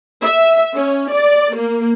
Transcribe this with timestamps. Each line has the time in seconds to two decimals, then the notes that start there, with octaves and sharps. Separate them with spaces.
0.22 E5
0.75 C#4
1.11 D5
1.55 A#3